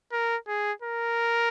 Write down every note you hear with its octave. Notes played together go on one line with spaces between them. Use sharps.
A#4
G#4
A#4